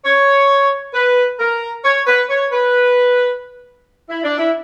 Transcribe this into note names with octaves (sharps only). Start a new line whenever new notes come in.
C#5
B4
A#4
C#5
B4
C#5
B4
E4
D4
E4